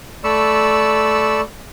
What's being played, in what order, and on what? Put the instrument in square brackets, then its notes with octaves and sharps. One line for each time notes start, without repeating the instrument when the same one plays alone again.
[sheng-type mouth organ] A3 D5 B5 C#6 E6